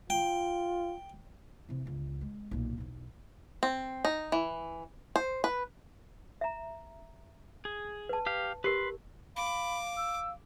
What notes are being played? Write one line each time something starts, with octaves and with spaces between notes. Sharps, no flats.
F4 G5
C3 E3
G1 C#2
G#3
B1 A#2
B1 E2
C4
D#4
E3
C5
B4
E5 A#5
G#4
B4 A5
G4 F5
G4 A#4 B4 C6
F5 B5 D6
E6